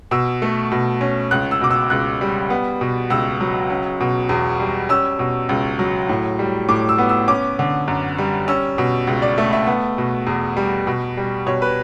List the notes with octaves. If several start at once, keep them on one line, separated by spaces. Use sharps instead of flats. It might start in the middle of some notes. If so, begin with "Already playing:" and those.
B2 E6
A3
B2
C#4
C#2 F#6
E6
B2 D6
E6
C#2 F#6
G3
B3
B2
C#2 E6
F#3
C#4
B2
E2
G3
C#4 E6
B2
C#2
F#3
A2
G3
A2 D6
E6
B3
E6
C#4 D6
D3
F#2
G3
C#4 E6
B2
C#2
D5
A3 E5
E5
B3
B2
E2
G3
B2
G3
B2 C#5
B4